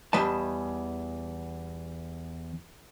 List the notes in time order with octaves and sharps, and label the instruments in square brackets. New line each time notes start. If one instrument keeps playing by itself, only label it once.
[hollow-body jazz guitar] E2 E3 G3 D#5 A5